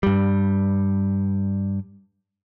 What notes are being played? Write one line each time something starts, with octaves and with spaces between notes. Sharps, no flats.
G2 G3